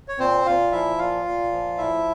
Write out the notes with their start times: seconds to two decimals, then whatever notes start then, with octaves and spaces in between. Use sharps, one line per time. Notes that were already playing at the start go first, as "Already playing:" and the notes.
0.08 C#5
0.18 A#2 C4 C5
0.46 A#2 F4 F5
0.72 F3 E4 E5
0.98 A#2 F4 F5
1.25 A#2
1.52 F3
1.78 A2 E4 E5